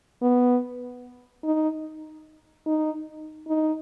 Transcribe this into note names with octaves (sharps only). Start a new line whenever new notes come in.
B3
D#4
D#4
D#4